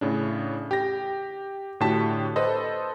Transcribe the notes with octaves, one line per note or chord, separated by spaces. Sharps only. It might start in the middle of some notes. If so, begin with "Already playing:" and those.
A2 C#3 D4
G4 A#6
A2 D3 F#4 G4 A5 B6
A4 B4 C5 D#5